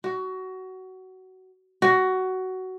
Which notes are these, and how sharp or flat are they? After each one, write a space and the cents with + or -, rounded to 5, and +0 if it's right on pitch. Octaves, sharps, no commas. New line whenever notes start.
F#4 +20
F#4 +15